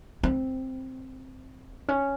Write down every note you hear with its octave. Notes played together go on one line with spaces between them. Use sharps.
C4
C#4